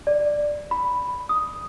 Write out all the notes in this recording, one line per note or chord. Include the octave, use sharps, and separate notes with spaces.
D5
B5
D#6